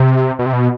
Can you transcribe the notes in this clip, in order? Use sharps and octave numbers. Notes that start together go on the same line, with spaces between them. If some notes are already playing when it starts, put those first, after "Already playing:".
Already playing: C3
B2
C3
B2